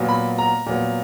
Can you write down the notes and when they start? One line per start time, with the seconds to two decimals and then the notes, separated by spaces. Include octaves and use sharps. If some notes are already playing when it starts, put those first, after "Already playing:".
Already playing: A#2 F#3 B3
0.09 B5
0.38 A#5
0.66 A#2 F#3 B3